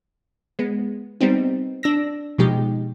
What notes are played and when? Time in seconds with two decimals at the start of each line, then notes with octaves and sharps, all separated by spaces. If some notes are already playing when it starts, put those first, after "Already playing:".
0.59 G#3 B3
1.21 G3 B3 C4 D#4
1.83 D4 E6 A#6
2.38 B2 F3 G#3 D#4 G4